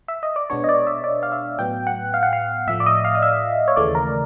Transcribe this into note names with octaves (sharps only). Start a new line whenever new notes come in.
E5
D#5
D5
B2 G#3 B3 D4 C#5
D#5
D5
E5
D5
F5
E5
A2 F#3 B3 G5
F#5
F5
F#5
F5
A2 F3 A3 E5
D5
D#5
F5
D#5
E5
C#5
D#2 C#3 E3 A3 D5
A#4